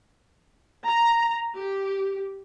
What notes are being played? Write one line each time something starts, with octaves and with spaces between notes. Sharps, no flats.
A#5
G4